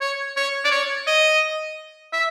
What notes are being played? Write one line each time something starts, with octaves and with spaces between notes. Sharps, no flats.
C#5
C#5
D5
C#5
D#5
E5